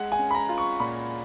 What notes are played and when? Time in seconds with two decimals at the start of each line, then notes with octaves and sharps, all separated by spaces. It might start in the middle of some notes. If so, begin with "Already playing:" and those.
Already playing: G#3 F#5
0.12 G#5
0.19 C#4
0.31 B5
0.34 A#5
0.49 F4
0.58 C#6
0.80 A#2 B5